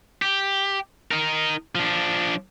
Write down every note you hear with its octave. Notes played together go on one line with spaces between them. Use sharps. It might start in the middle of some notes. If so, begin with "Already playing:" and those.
G4
D#4 A#4
F3 D4